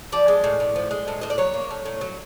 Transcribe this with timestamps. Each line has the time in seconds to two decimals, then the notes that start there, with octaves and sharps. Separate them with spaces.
0.12 F3 D5
0.28 G#3
0.44 A2
0.60 A2
0.76 F3
0.91 G#3
1.08 A2
1.21 A2 D#5
1.30 D5
1.38 F#3 C#5
1.54 A#3
1.71 A2
1.86 A2
2.01 F#3